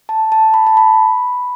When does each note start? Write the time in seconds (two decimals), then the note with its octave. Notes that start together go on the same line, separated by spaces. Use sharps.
0.09 A5
0.32 A5
0.54 B5
0.67 A5
0.77 B5